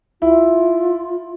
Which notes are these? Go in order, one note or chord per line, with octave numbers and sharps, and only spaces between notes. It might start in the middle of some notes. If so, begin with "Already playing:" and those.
E4 F4